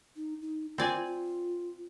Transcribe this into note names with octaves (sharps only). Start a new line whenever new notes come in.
D#4
D#4
C4 F4 D5 G#5
F4